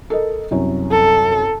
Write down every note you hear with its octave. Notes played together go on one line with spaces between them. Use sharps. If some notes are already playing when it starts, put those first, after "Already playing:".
A4 A#4 D#5
C2 F#2 C#5
A4